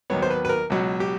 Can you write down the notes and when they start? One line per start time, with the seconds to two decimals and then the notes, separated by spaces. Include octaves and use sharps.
0.10 D#2 D#3 F#3 B3 C#5
0.22 C5
0.30 B4
0.45 B4
0.49 A#4
0.70 C#2 B2 F#3
1.00 G4